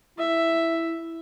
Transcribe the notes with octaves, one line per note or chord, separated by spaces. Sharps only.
E4 E5